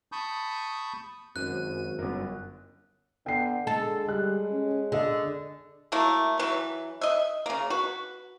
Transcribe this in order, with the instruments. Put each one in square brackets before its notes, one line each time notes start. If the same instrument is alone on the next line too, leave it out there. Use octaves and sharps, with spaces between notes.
[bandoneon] A5 B5 C#6 D#6 G6
[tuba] G#1 [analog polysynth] F#2 D#7 [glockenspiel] F#6
[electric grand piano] G1 A#4 [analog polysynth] F#2
[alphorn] D3 [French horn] B3 [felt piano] G5 C7
[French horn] D3 [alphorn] G#3 [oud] A4
[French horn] G3 [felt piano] F#6
[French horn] C#4
[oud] D3 [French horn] D4 [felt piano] G#4 D#5
[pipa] F#3 A3 A#3 E4
E3 F#3 B4
D#5 E5
C#3 A#3
F#4 B4